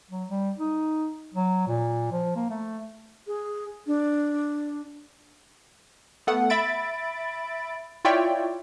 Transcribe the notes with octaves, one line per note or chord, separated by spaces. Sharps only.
F#3
G3
D#4
F#3
A#2
F3
A#3
A3
G#4
D4
A3 B3 A4 F#5
E5 B5 A6 D7
E4 F4 C#5 D5 E5 G5